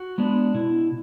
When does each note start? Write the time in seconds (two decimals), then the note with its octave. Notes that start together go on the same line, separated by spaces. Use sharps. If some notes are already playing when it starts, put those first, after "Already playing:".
Already playing: F#4
0.18 G#3 B3 D4
0.54 B2 E4